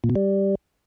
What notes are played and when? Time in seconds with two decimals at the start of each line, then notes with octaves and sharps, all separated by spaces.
0.04 A#2
0.10 B2
0.15 G3